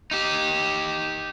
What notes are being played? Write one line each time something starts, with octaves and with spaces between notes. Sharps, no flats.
D#4 G4